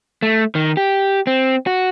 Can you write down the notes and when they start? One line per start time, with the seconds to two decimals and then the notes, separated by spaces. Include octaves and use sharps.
0.22 A3
0.55 D#3
0.77 G4
1.27 C4
1.67 F#4